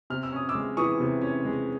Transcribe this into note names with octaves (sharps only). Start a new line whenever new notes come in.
C3 F6
E6
C#4 D#6
D6 E6
G#3
E3 C#6 D#6
C3
C#4
G#3